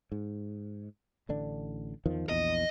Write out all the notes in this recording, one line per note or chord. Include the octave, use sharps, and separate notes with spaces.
G#2
A1 D3 D4
E2 D#3 F3
A#1 E2 D#5